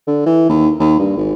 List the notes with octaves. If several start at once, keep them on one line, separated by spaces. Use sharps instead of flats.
D3
E3
D#2
D#2
G2
G#1